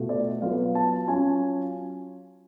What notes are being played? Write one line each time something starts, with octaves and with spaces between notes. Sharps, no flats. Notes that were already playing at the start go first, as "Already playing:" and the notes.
Already playing: B2 A3 F4
D5
F#3 B3 F4 F5
A5
F#3 C#4 F4 G#5